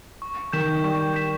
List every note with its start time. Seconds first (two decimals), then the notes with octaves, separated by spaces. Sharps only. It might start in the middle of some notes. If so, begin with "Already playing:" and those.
0.22 C#6
0.53 D#3 G6 B6 E7
0.84 G3 C#6
1.14 G6 B6 E7